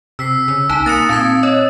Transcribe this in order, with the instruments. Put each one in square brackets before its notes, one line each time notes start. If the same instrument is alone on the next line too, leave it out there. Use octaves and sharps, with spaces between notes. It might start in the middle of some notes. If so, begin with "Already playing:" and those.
[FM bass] C3 [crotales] E6 B6 C7
[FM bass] C#3 [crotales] E6
[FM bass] C2 [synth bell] D#4 A5
[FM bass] A#3 [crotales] D#6 A6 [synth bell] A#6 C#7
[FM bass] A#2 [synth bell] C4 A5 G#6
[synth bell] C#5 D#5